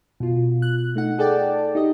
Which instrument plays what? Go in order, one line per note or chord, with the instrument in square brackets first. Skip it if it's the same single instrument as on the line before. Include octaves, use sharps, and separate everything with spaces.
[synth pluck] B2 F4
F#6
A3 D#4 F#5
G#4 A4 D5 G5 A5
D#4 G4 D#5